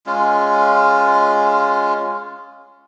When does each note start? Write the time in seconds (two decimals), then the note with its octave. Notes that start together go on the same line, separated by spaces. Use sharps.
0.06 G#3 C#4 F4